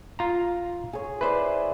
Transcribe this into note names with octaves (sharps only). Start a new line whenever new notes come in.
F4 A#5
G#4 C#5
E4 B4 C5 D5